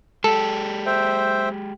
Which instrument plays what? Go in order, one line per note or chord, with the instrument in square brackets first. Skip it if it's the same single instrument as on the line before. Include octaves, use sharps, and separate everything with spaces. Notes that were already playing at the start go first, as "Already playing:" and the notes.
[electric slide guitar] G#3 G4 [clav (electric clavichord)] A4
[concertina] C5 E5 G5